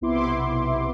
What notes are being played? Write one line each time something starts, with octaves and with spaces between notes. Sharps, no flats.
B1 C3 B3 E4 C6 D6